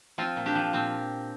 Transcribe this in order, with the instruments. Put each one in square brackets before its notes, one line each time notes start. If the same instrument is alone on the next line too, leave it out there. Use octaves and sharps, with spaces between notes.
[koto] F3 C4 F4
A#2
D4 G4
F3
A#2 C4